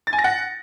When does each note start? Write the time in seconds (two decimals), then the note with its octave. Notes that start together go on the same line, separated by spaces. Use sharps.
0.07 A6
0.13 G#5
0.19 A#6
0.24 F#5